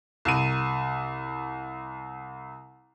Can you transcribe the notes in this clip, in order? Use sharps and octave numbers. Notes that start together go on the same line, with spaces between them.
C2 D#7